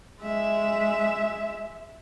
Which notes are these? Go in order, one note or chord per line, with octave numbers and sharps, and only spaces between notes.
G#3 E5